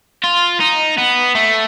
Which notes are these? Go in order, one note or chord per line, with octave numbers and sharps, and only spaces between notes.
F4
D#4
B3
A3